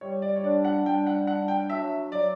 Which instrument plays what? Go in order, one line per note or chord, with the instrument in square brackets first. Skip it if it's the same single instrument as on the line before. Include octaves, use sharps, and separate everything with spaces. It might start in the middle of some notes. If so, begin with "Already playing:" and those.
[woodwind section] G3 [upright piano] C#5
[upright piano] D5
C#5
[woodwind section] D4 [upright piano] D5
[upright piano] F#5
[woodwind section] G3 [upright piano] G5
[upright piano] F#5
[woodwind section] D4 [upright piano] F#5
[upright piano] G5
[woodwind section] F#3 [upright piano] E5
[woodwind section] F#3 [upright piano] D5